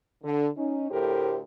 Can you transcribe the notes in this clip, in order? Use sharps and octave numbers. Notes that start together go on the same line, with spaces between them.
D3
C#4 D#4
D2 A2 G4 A4 A#4 C5